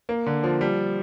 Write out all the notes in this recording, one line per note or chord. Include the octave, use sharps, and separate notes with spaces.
A#3
D3
F3
G3